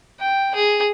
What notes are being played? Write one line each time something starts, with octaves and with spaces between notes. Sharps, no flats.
G5
G#4